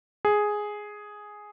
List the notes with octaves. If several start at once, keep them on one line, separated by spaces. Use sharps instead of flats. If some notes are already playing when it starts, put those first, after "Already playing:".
G#4